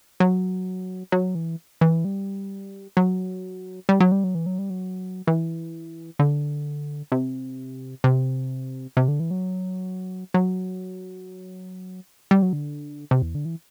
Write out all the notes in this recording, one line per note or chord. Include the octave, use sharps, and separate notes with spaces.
F#3
F#3
E3
E3
G3
F#3
G3
F#3
G3
F#3
E3
F#3
G3
F#3
E3
D3
C3
C3
C3
D3
E3
F#3
F#3
G3
F#3
D3
C3
E2
D3
E3